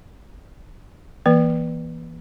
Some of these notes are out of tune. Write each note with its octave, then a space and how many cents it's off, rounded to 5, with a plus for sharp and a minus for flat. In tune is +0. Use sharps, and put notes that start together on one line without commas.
E3 +0 A#3 +35 B4 +0